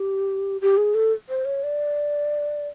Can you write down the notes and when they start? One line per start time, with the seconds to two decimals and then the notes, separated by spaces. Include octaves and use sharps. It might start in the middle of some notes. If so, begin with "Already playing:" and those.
Already playing: G4
0.61 G4
0.77 G#4
0.95 A4
1.29 C5
1.45 C#5
1.63 D5